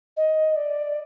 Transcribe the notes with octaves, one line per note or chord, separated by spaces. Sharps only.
D#5
D5